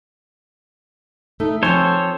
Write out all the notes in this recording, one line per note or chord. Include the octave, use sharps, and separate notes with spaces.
A3 D#4
F3 C4 A4 C5 C#5 G#5